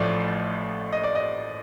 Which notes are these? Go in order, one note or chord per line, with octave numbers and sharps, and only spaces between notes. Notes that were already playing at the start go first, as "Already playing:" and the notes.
Already playing: A1 A2 F3 A3 D5
D#5
D5
D#5